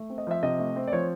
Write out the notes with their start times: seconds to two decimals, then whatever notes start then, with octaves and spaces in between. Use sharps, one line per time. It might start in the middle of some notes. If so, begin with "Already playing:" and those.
Already playing: A3
0.10 C4
0.18 D#5
0.27 F3 E5
0.43 C3 D#5
0.59 A3
0.76 C4
0.87 D5
0.93 F3 C#5